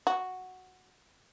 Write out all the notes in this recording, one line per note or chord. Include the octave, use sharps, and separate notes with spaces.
F#4